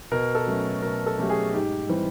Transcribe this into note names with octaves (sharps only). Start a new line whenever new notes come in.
B2 A#4
A4
F#3 A3 C#4
B2 A#4
A4
F#3 A3 C#4 G4
G#4
G#2 G4
E3 G3 C4